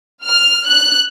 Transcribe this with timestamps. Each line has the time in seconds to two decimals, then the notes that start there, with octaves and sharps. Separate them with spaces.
0.24 F6
0.67 F#6